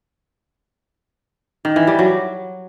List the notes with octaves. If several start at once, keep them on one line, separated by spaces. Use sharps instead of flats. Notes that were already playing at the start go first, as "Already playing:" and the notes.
D#3
E3
G3
F#3